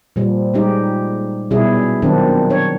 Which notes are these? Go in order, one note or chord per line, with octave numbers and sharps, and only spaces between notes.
A#2 F3 G3
G3 G#3 C#4 D#4 G4
B2 G3 C#4 E4 G#4
D#3 F3 F#3 B3 C4 D4
D4 C#5